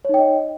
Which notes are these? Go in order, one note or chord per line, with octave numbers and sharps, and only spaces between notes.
D#4 C#5 D#5 G5